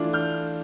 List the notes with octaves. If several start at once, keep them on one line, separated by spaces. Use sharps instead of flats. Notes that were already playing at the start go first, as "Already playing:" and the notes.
Already playing: E3 A3 D4 F4
F6 G6